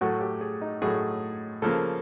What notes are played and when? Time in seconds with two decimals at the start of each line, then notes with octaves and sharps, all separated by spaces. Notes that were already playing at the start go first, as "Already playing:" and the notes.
0.01 A2 F#3 A3 F#4
0.21 G4
0.41 G#4
0.61 D#4
0.82 A2 F#3 A3 G#4
1.62 C#3 F3 A#3 A4